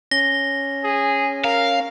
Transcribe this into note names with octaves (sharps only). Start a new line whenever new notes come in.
C#4 A#6 G7
G#4
A#4 F5